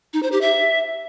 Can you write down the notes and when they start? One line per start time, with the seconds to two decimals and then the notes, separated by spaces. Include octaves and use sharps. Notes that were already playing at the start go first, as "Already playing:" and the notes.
0.13 D#4
0.23 C5
0.32 G4
0.41 E5